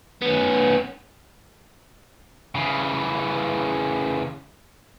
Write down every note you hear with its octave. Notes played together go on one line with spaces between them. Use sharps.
B3 C#4
C#3 E3